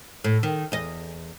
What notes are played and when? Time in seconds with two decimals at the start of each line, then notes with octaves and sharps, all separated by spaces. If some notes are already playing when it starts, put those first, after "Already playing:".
0.24 A2
0.43 D#3
0.72 E2 D#5